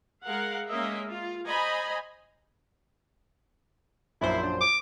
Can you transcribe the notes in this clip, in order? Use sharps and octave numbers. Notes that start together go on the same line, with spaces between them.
G#3 A#4 F5 F#5
G#3 A#3 C#4 A#4 D#5 E5
F4
C5 D#5 G#5 A#5 B5
A#1 F#2 E4 C5
D4
D6